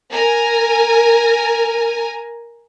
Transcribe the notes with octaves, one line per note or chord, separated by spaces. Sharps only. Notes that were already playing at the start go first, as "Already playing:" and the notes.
A#4 G#5 A#5